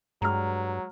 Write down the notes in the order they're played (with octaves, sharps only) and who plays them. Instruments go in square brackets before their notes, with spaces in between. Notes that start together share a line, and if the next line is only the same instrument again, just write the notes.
[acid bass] G2 [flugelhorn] F#3 [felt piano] G#3 F6 [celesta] A#5